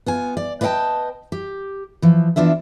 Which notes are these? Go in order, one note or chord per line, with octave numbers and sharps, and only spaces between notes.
B3 F4 G#5
D5
B4 D5 D#5 F5 G5 A5
G4
E3 F3
E3 B3 D4 F4 E5